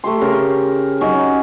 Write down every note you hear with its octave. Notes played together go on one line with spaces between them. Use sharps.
A3 G4 C6
C#3 A#4
F#3 C#4 D#4